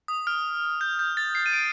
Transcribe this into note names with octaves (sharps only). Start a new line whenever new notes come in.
D#6
F6
G6
G6
A6
C7
D#7
D7